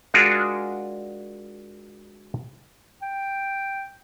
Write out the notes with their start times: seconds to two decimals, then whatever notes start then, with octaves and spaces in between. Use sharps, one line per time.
0.14 G#3 D4 F4 F#4 G#4 A#4
3.02 G5